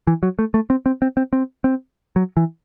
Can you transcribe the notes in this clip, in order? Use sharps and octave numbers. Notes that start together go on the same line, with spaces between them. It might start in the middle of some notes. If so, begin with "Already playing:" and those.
E3
F#3
A3
A3
C4
C4
C4
C4
C4
C4
F#3
E3